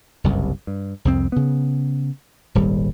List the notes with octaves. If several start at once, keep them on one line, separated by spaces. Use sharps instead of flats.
F#1 C2 G2 C3
G2
C2 F2 C4
C#3 B3
D#1 G#1 G3